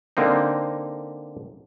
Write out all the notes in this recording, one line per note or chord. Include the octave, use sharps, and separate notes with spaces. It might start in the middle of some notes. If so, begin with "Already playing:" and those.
D3 A#3 C4 D#4